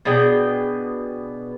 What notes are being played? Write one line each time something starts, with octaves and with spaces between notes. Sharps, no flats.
B2 D4 G#4 G5